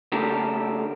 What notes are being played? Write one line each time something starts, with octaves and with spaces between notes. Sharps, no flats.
C#3 A3 D4 G4 A4 A#4